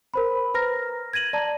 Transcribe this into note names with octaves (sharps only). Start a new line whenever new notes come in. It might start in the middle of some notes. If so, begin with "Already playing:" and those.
A#4 C5 B5
B4 A#5 F6 A#6
G#6 A#6 D#7 F#7
D5 A5 A#5